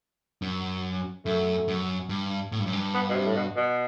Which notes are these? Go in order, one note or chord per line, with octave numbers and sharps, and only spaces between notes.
F#2
F#2 A3
F#2
G2
A2
G2
F#2
G2
B3
B2
C3
A2
B2
B2